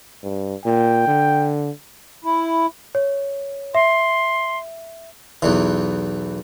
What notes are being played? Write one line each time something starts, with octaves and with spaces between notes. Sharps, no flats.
G2
A#2 G5
D3
E4
C#5
E5 C6
B1 E2 E3